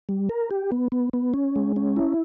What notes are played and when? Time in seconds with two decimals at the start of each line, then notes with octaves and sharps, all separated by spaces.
0.09 G3
0.29 A#4
0.51 G4
0.72 B3
0.92 B3
1.13 B3
1.34 C#4
1.56 G#3
1.76 C#4
1.96 E4